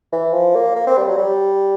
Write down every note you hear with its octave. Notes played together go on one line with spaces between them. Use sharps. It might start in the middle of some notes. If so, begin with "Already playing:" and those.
E3
F3
A#3
A#3
C4
G3
F#3
G3